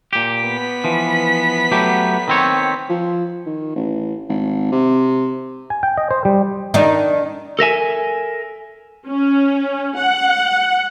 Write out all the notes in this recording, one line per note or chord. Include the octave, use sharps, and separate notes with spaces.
A#2 G4
B3 B6
E3 F3
F#3 A3 G4
D#3 C4 C#5
F3
D#3
A1
G#1
C3
G#5
G5
D#5
C5
G3
D#3 D4 D#4
A4 A#4 E5 G#5
C#4
F#5